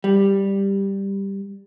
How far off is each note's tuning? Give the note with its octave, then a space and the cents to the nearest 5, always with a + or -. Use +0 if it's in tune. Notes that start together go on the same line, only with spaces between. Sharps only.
G3 +5